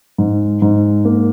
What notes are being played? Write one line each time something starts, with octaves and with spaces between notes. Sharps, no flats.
G#2
G#2
A#3